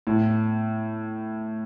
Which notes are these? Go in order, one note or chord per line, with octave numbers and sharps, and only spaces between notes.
A2